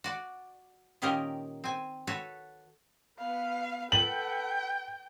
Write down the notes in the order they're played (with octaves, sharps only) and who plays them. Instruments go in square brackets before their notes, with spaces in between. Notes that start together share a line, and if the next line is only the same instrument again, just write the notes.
[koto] F#4 D5
A#2 D#3 C#4 G4 A#4 D#5
C4 G#5
F#4 A4 B4 C#5
[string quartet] B3 B4 [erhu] F5
[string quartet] A4 B4 F#5 [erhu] G5 [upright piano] F#7